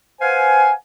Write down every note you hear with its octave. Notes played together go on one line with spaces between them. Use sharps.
B4 C5 F5 F#5 G#5